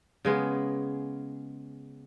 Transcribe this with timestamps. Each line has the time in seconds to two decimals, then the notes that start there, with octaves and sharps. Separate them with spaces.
0.25 C#3 G#3 B3